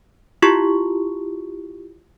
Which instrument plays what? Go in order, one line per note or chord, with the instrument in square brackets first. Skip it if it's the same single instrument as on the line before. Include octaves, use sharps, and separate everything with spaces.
[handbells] E4 F4 G4 C#6